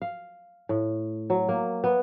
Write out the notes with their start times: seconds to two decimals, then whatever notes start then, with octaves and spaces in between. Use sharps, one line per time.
0.02 F5
0.69 A2
1.30 F#3
1.49 A#3
1.84 B3